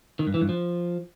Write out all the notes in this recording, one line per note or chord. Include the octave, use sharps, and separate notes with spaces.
D#3
G2
E3
G2
F3